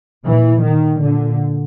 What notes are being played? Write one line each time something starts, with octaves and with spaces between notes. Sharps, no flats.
A#2 E3
D#3
A#2 D3